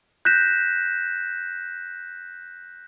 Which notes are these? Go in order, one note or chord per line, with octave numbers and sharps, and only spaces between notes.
F#6 G6 A#6 B6 E7